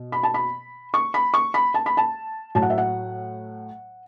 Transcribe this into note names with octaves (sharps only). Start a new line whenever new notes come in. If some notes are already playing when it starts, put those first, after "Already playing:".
Already playing: B2
B5
A5
B5
C#6
B5
C#6
B5
A5
B5
A5
A2 F#3 A5
F#5
E5
F#5